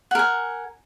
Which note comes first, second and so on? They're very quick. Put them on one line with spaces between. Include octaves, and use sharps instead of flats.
F#5 A#4 G#5